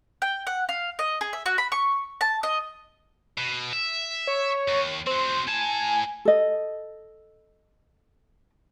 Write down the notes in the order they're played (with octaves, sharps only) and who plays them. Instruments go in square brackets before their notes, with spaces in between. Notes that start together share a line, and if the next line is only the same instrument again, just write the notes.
[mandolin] G5
F#5
F5
D#5
G#4
E5
F#4
B5
C#6
A5
D#5
[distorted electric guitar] B2
E5
[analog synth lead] C#5
[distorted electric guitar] D#2
[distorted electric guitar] C4 F#4 [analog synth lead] C5
[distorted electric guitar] A2 A5 [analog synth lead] G#5
[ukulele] A4 D#5